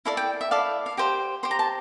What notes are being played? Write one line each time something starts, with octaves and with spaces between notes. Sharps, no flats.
E4 A4 D5 F5
G5
E5
E4 A4 D5 F5
F5
G4 C5 G5
G4 C5 C6
A#5
A5